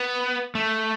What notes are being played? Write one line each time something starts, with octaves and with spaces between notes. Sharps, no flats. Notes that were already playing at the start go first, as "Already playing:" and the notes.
Already playing: B3
A3